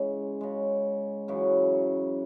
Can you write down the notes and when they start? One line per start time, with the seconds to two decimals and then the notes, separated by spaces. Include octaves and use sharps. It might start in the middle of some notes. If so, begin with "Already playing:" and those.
Already playing: C#3 E3 G#3 G#4
0.41 C#3 G#3
1.28 F#2 C#3 E3